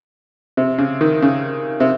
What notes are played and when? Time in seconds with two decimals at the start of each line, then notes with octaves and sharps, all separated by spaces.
0.57 C3
0.78 C#3
1.01 D#3
1.22 C#3
1.80 C3